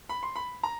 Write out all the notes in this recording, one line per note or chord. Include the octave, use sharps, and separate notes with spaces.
B5
C6
B5
A#5